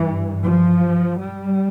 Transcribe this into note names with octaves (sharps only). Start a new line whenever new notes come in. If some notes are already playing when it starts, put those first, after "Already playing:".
Already playing: G2 E3
F3
G3